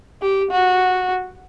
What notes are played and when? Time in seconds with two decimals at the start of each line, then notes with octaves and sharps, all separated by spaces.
0.22 G4
0.51 F#4